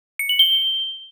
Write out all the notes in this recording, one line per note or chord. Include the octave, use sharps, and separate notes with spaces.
C#7
F#7
G7